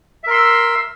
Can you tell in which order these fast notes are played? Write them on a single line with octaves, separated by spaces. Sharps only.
E5 A#4 C6 E6